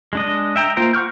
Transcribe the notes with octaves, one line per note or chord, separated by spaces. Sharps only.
G#3 D4 D#5
E5 G5 A#5
A#3 F4 C5 G5 A#5
F#5 C#6 F6 G6